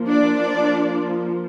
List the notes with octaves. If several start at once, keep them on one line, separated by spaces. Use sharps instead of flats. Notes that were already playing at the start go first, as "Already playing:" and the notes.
Already playing: F3 A#3
D4 D5